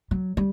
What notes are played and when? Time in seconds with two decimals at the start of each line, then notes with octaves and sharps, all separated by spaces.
0.11 F#3
0.37 G3